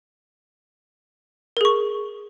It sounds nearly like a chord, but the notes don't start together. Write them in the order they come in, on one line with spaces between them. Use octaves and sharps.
A#4 G#4 C#6